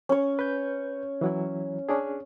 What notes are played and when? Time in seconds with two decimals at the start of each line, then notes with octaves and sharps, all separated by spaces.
0.09 C#4 C#5
0.39 B4 G6
1.21 E3 F#3 E4
1.89 C#4 D4 G#4